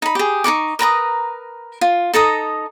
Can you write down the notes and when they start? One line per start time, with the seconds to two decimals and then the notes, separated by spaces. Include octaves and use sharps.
0.02 D#4 B5
0.15 G4 G#4
0.44 D#4 A4 C#6 D6
0.79 A#4 B4 A#5 D#6
1.81 F4
2.14 D#4 A4 A#5 D#6